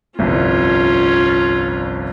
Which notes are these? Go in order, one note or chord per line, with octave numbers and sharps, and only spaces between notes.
G1 C2 F2 C#4 F4